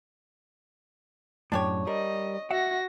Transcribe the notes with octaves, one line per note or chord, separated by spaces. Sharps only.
F#2 A2 D4 G4 C#5
G3 A#4 D#5
F#4 E5 F#5 A#6